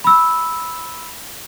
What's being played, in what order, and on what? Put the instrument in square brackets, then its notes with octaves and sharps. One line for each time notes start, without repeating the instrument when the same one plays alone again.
[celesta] B5 E6